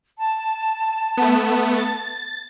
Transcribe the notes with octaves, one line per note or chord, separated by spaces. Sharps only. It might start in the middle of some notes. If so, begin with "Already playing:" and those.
A5
A3 B3
A6